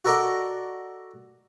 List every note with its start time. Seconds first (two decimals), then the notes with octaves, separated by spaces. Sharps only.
0.05 F#4 A4 A#4 D5 D#5 F#5